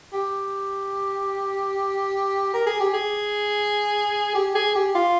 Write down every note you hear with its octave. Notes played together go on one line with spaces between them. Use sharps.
G4
A#4
G#4
G4
G#4
G4
G#4
G4
F4